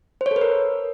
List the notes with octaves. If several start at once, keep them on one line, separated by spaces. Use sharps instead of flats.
C5
C#5
A4
B4
A#4